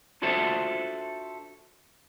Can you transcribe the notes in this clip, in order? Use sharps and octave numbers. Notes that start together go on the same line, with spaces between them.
D4 F4 F#4 A4 C5 E5